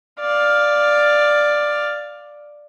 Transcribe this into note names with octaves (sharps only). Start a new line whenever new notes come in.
D5 F5